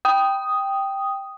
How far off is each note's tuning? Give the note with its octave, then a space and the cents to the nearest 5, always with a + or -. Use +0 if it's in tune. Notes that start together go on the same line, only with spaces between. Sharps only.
G5 +0 D#6 +0